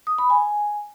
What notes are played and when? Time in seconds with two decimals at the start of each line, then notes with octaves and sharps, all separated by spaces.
0.07 D#6
0.18 B5
0.30 G#5